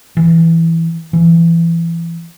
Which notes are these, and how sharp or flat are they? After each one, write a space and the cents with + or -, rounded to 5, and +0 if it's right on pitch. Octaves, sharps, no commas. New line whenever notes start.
E3 +0
E3 +25